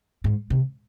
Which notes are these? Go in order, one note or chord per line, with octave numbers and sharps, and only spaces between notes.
G#2
C3